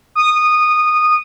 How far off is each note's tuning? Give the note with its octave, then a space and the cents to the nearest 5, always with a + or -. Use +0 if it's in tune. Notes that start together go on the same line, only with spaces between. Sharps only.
D#6 -15